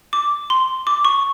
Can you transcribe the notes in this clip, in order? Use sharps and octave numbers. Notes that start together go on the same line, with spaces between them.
D6
C6
D6
C#6